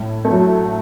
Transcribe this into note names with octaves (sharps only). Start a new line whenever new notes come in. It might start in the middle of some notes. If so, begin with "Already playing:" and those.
Already playing: A2
A3
F#3